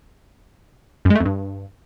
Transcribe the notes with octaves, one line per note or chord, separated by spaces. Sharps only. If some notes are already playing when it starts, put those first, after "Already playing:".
F#2
G#3
A3
F2
G2